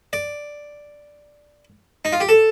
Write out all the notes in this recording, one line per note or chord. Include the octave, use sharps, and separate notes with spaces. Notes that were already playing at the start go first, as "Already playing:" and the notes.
D5
D#4
F4
G4
A4